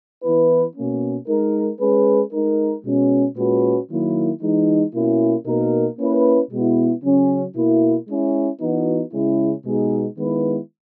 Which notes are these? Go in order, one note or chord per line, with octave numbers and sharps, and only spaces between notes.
E3 B3 E4 B4
B2 A#3 C#4
G#3 D#4 A#4
G#3 C#4 G#4 B4
G#3 D#4 A#4
B2 G#3 C#4
A#2 G#3 C#4 F#4 B4
D#3 F#3 A#3 E4
E3 G#3 D#4
B2 A#3 C#4 E4
B2 A#3 D#4 A#4
A#3 C#4 E4 B4
B2 G#3 B3 E4
C#3 F#3 C#4
B2 A#3 E4
G#3 C#4 E4
E3 B3 D#4 F#4
C#3 G#3 C#4 E4
B2 G#3 B3 D#4 G#4
D#3 G#3 B3 E4 B4